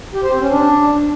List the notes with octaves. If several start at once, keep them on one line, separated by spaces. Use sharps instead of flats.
G4
C5
C4
C#4
D4